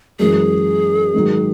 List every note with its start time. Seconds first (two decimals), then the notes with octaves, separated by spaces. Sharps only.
0.19 F#2 E3 G#3 G#4
1.14 G#2 D#3 F#3